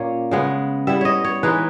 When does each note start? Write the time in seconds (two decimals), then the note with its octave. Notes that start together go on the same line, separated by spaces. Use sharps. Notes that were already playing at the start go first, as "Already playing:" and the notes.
Already playing: A#2 A#3 C#4 C#5
0.31 C#3 G#3 B3
0.87 G3 B3 E4 E5
1.01 C#5 D#5
1.24 C#5
1.43 E3 G#3 D#4 B4